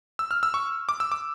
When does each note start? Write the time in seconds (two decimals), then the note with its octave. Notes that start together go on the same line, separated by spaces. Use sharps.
0.19 E6
0.31 F6
0.43 E6
0.54 C#6
0.89 D6
1.00 E6
1.12 D6